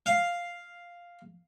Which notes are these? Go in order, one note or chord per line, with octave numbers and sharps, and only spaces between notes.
F5